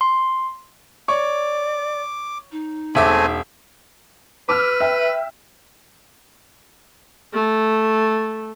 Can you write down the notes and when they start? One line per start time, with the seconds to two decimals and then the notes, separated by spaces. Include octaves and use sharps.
0.01 C6
1.08 C#5 D5 C#6 D6
2.51 D#4
2.95 E1 A3 C4 E5 G#5 D6
4.49 B4 D6 E6 F6
4.80 E5 G5
7.34 A3